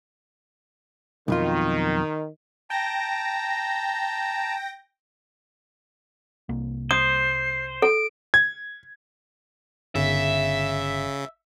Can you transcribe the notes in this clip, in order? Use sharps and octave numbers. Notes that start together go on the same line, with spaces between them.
B1 F2 D#3 F4
G5 A5 A#5 A#6
C2 A#3
C5 D#6 C7
A4 D7
G#6
G1 C#3 E5